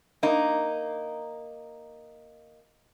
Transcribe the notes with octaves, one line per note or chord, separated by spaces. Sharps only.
A#3 D#4